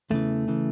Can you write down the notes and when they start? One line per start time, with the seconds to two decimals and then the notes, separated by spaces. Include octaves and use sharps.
0.10 E2 C#3 E3 A3
0.48 C#3 E3